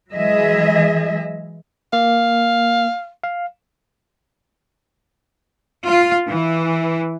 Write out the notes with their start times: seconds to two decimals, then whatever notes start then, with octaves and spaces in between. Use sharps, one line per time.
0.13 E3 F#3 G#3 G#4 D#5 E5
1.93 A#3 F5
3.24 F5
5.84 F4
6.29 E3